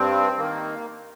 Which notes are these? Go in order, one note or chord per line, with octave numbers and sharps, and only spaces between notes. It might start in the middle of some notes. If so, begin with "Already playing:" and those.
Already playing: G2 C4
D#3 A#3